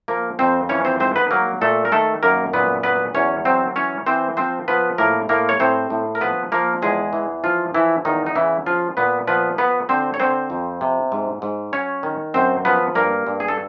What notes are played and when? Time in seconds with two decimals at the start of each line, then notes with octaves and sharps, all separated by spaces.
0.08 F3 A#3 A#4
0.39 F2 C4 C5
0.69 E3 C#4 C#5
0.85 C4 C5
1.00 G#2 C4 C5
1.16 B3 B4
1.31 F#3 A#3 A#4
1.61 A#2 A3 A4
1.85 A#4
1.92 D#3 A3 A4
2.23 F#2 A#3 A#4
2.53 A#2 B3 B4
2.83 F#3 B3 B4
3.14 E2 C#4 C#5
3.45 F#3 C4 C5
3.76 E3 C#4 C#5
4.06 E3 C4 C5
4.37 F3 C4 C5
4.68 F3 B3 B4
4.98 A2 A#3 A#4
5.29 A2 A#3 A#4
5.49 C#5
5.60 A2 C4 C5
5.90 A2
6.15 A#4
6.21 F3 B3 B4
6.52 F3 A#3 A#4
6.82 E2 G#3 G#4
7.13 E3
7.44 F3 F4
7.74 E3 F3 E4
8.05 E2 D#3 D#4
8.26 D#4
8.35 C#3 E3 E4
8.66 F3 F4
8.97 A#2 B3 B4
9.27 F3 B3 B4
9.58 F3 B3 B4
9.89 D3 C4 C5
10.14 C#5
10.20 D3 C4 C5
10.50 F2
10.81 C3
11.12 G#2
11.42 G#2
11.73 F#3 C#4 C#5
12.03 D#3
12.34 F#2 C4 C5
12.65 F3 B3 B4
12.95 G2 A#3 A#4
13.27 G2
13.40 G#4
13.48 A4